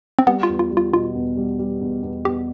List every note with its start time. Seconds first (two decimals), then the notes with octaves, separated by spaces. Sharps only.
0.19 C4
0.27 G3 B3
0.43 F4
0.49 E2
0.59 F4
0.71 G3
0.77 F4
0.92 B2 F4
1.15 E2
1.37 G3
1.59 G3
1.81 E2
2.03 E2
2.25 E2 G4